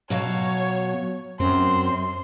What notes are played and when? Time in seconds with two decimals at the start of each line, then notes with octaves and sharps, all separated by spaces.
0.10 B2 F#3 C#5 F5
1.40 F#2 C4 C6